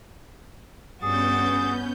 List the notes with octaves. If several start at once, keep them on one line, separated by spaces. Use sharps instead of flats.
G2 B3 C#4 F#4 G#4 G6 A6